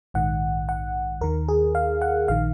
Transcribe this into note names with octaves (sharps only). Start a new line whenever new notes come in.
A#1 G#2 D#3 F#5
F#5
D#2 D#3 A#4
G#4
F5
F#5
A#1 D#3 F5